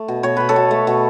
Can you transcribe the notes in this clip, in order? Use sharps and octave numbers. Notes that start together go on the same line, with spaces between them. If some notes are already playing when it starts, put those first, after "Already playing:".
Already playing: A3
B2
B2 C#5
B2 B4
A4 C#5
B2
A3
B2